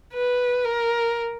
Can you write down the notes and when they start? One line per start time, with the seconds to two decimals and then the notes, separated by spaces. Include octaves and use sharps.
0.13 B4
0.64 A#4